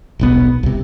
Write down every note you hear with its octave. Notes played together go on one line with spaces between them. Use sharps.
D#1 B1 B3
C2 C3